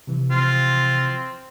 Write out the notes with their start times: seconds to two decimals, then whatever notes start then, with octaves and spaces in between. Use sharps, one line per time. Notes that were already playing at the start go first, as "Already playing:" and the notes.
0.07 C3 E3 F3
0.31 C4 F4